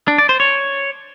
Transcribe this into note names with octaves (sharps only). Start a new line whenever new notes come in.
D4
D5
C5
C#5